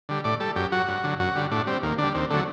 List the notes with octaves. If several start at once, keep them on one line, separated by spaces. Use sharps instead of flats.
D3 G3
A2 D5
G3 A4
F#2 G4
F#3 F#4
G2
D3 F#3
F#2 F#4
D3 G3
A2 D4
G3 C4
D#2 A#3
D3 G3 D4
D#2 C4
D3 F#3 A3